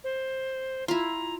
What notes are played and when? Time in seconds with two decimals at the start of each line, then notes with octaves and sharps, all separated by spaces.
0.04 C5
0.88 E4 F4 A#5